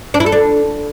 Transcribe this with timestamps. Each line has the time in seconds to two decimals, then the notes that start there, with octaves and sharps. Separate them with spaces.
0.14 D4
0.20 E4
0.26 A4
0.32 D4